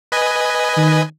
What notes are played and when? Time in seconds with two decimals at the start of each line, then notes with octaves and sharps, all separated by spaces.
0.12 B4 D#5 G#5
0.77 D#3